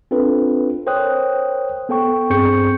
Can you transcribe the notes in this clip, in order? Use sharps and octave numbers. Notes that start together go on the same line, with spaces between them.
C4 D4 F4 A4 B4
A#4 C5 C#5 G5 D#6 F#6
B3 A4 G5 C#6
G2 C4 G#4 C#6 G6 C#7